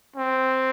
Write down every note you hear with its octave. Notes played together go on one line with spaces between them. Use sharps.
C4